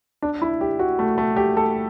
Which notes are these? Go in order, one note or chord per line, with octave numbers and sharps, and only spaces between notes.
D4
E4
G4
F#4
A3
A3
G4
A4